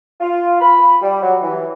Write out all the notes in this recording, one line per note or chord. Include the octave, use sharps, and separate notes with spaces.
F4
B5
G3
F#3
E3